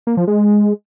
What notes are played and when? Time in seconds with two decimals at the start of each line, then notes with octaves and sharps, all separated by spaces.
0.07 A#3
0.17 F3
0.27 G#3